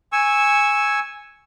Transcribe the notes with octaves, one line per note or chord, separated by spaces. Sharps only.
G#5 C#6 E6